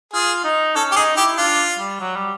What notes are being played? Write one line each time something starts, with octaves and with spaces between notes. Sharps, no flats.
F4 G#4
D#4
C#4 A4
G4
D#4 G#4
E4 G4
D4 F4
G3
F#3
G3